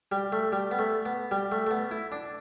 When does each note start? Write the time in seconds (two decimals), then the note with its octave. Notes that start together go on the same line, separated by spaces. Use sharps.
0.12 G3
0.32 A3
0.52 G3
0.71 B3
0.79 A3
1.06 B3
1.31 G3
1.52 A3
1.67 A3
1.71 B3
1.91 E4
2.12 D4